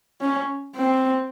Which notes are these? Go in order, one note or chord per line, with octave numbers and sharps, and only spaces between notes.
C#4
C4